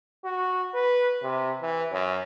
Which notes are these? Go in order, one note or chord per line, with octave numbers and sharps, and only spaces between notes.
F#4
B4
C3
E3
F#2